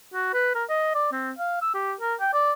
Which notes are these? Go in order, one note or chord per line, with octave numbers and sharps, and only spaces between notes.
F#4
B4
A#4
D#5
D5
C4
F5
E6
G4
A#4
G5
D5